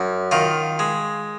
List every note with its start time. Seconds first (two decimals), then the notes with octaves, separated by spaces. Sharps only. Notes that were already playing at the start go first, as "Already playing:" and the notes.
Already playing: F#2
0.31 D#3 F4
0.79 G#3